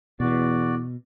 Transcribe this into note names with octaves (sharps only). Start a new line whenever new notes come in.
E2 B2 F#4 D5